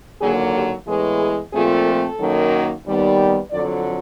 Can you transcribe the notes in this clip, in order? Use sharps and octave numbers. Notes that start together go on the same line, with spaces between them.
D#2 D3 F#3 A#3 G#4
G4
A2 E3 G#3 B3 G#4
G#4
A#2 F3 A3 C4 G#4
A4
F#2 D#3 F#3 A#3
D#2 D#3 G3 B3
F2 D3 F#3 D5